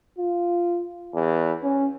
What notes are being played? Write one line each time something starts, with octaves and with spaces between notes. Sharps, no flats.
F4
E2
C#4